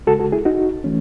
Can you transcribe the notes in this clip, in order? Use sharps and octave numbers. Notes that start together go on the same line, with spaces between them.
C#2 C#3 G#3 F#4 A4
F#4 A4
E4 G#4
D#4 F#4
E3 A3 C#4